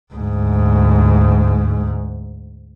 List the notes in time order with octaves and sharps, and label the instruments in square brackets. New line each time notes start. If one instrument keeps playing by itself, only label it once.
[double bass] D2 G#2